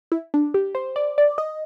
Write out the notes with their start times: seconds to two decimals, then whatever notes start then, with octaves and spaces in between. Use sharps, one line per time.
0.12 E4
0.34 D4
0.54 G4
0.75 C5
0.96 D5
1.18 D5
1.38 D#5